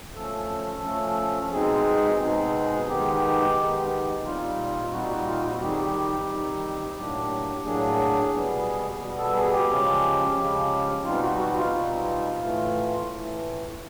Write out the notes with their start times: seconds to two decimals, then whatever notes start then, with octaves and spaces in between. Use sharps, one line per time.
0.15 F3 A3 C#4 A4
0.84 F3 A3 C#4
1.52 B2 G#3 C4 D#4 G#4
2.20 B2 G#3 C4 D#4 G#4
2.88 D#3 G#3 B3 D#4 G4
3.56 D#3 G#3 B3 D#4
4.24 A#2 G3 C4 D#4 F4
4.92 A#2 G3 C4 D#4 F#4
5.09 F#4
5.26 F4
5.44 F#4
5.60 D#3 G3 C4 D#4 G4
5.69 G#4
5.76 G4
6.29 D#3 G3 C4 D#4
6.96 A2 F#3 A#3 D4 G4
7.64 A2 F#3 A#3 D4 G#4
8.33 B2 G3 B3
9.01 B2 G3 B3
9.18 A4
9.35 G#4
9.51 G4
9.69 C#3 F3 G#3 C#4
10.37 C#3 F3 G#3 C#4
11.05 B2 G3 C4 D#4 F4
11.22 F#4
11.39 F#4
11.56 F4
11.73 B2 G3 C4 D#4
12.41 A2 E3 A3
13.09 A2 E3 A3